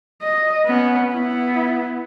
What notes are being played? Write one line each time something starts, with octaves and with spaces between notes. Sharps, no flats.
D#5
B3 C#4
B3 E4